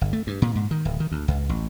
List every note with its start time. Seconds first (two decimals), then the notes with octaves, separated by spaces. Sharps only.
0.01 G1
0.13 A3
0.27 G2
0.42 A#2
0.55 G#2
0.71 D#3
0.85 D1
1.00 D#3
1.12 D2
1.28 C#2
1.49 A1